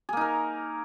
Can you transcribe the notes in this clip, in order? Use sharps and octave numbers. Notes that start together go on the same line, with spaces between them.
A#3 D#4 G#4 A#4